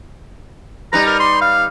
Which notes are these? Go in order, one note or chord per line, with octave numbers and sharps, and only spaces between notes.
G3 D#4 B4 A#5
A#4
C6
F5